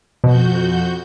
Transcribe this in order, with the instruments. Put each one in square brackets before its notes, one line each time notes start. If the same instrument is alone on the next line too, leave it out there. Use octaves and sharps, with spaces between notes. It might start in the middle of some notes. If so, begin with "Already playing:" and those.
[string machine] F2 F#4 G6 [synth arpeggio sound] B2